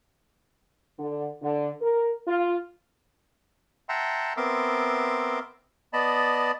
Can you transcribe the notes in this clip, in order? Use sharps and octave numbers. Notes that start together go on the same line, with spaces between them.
D3
D3
A#4
F4
E5 F#5 G5 A5 A#5 C6
B3 C4 A#4 E5 C6 D6
B3 D5 D#5 A5 B5